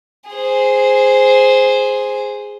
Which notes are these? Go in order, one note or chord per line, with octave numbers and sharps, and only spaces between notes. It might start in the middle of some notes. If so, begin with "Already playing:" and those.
G#4 C5